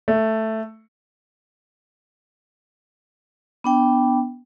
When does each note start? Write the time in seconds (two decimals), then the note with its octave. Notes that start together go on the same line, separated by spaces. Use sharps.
0.08 A3
3.64 B3 D4 G5